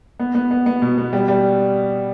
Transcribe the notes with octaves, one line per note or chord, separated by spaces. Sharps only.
B3
B3
B3
B3
B2
B3
G3
G3